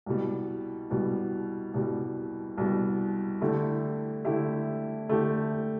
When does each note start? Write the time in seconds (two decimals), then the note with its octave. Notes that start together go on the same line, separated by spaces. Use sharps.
0.06 C2 B2 G3
0.90 C2 B2 G3
1.74 C2 B2 G3
2.58 C2 B2 G3
3.41 D3 A3 E4 G4
4.25 D3 A3 E4 G4
5.09 D3 A3 E4 G4